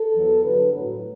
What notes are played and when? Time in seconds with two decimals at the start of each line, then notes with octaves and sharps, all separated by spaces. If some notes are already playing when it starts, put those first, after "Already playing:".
Already playing: A4
0.13 E2 B2 F#3
0.43 G2 D3 F#3 B4
0.74 A2 F#3